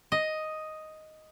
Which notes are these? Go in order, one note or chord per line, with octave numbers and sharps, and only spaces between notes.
D#5